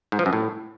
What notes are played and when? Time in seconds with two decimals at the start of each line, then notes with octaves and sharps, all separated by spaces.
0.12 G#2
0.19 F3
0.26 F#2
0.33 A2